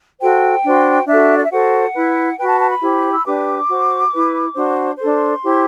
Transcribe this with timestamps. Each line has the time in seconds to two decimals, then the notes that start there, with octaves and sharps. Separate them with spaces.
0.20 F#4 A4 C5 G5
0.64 D4 F#4 C5
1.07 D4 F#4 A4 E5
1.37 D5
1.44 E5
1.50 F#4 A4 C5 F#5
1.94 E4 B4
2.38 F#4 B4 G5
2.48 A5
2.60 A5
2.70 B5
2.81 E4 G4 C5
3.13 E6
3.25 D4 G4 B4 D6
3.68 F#4 C5
4.12 E4 B4
4.54 D4 F#4 C5
4.98 D4 A4 C5 C6
5.42 E4 G4 C5